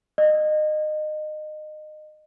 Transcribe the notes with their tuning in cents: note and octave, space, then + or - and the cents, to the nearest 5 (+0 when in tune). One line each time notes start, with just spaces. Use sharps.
D#5 -25